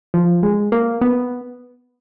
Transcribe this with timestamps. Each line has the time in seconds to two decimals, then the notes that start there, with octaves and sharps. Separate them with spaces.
0.14 F3
0.43 G#3
0.72 A#3
1.01 B3